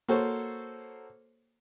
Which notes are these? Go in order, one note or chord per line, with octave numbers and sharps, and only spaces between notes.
A#3 F#4 A4 C5 C#5